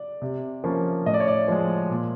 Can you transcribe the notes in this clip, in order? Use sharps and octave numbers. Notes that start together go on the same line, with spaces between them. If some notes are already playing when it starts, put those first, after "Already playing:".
Already playing: D5
C3
F3 A#3 C#4
A2 D#5
D5
C#5
D5
F3 G#3
A#2